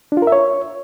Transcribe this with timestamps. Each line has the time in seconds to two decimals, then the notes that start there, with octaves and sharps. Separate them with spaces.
0.12 D4
0.17 F4
0.22 A#4
0.27 E5
0.32 C#5